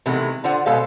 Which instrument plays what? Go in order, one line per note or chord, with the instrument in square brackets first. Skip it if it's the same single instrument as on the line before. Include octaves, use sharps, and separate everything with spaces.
[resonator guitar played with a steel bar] C3 D#3 E3 G#3 A3 B3
D3 F4 C5 F#5
B2 G#3 A4 C5 F5